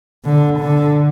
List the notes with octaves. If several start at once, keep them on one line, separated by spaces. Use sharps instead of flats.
D3
D3